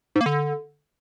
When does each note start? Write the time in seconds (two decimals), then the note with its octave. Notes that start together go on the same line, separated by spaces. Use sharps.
0.15 G#2
0.21 A#3
0.26 D3